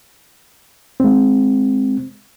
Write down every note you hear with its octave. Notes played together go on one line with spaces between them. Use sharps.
G#3 C4